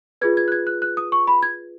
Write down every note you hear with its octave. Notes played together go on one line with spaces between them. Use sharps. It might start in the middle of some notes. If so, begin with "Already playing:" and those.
F4 G#4 B4 G#6
G#6
F#6
G#6
F#6
F#6
D#6
C#6
B5
G#6